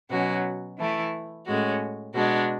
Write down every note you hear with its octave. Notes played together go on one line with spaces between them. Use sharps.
B2 F#3 C#4 F#4
E3 A3 E4
A2 G#3 C#4 F#4
B2 G#3 D4 F#4